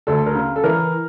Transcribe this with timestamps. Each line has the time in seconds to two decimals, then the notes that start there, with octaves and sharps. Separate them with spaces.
0.07 D2 A4
0.26 A#4
0.35 C#3
0.56 A4
0.64 E3 A#4